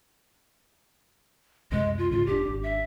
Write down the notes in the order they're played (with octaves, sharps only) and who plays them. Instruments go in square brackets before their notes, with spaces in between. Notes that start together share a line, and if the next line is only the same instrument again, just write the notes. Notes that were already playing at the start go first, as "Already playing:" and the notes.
[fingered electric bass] C#2 F#2 C3 [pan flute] G#3
[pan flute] F4
[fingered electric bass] G#2 C#3 [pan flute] F4
[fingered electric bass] E1 D4 [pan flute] G4
[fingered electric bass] G#1 D4
[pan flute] E5